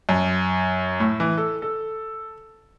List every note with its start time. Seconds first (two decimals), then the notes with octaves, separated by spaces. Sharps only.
0.09 F#2
1.00 A2
1.20 E3
1.37 A4
1.62 A4